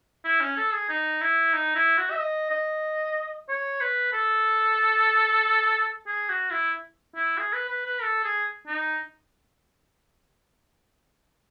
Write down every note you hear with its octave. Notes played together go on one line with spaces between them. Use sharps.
E4
C#4
A4
G#4
D#4
E4
D#4
E4
F#4
E5
D#5
D#5
C#5
B4
A4
G#4
F#4
E4
E4
G#4
B4
B4
B4
A4
G#4
D#4